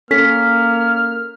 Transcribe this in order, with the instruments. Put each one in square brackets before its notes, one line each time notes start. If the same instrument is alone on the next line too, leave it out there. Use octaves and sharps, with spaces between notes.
[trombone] A#3 [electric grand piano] C#4 [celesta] A4 B6 [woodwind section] F6